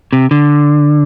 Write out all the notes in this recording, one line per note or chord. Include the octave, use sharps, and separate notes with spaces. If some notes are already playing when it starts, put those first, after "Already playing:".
C3
D3